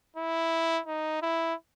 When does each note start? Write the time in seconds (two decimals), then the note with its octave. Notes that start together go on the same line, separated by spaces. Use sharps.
0.16 E4
0.87 D#4
1.22 E4